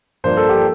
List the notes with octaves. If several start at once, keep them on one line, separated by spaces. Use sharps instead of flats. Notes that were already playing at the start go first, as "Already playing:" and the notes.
G2 F3 A#3 D4 C5
A4
G4